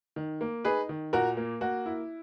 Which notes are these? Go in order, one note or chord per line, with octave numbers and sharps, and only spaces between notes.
D#3
A#3
D#4 G#4 B4
D#3
A#2 F#4 A#4
A#3
A#3 F#4
E4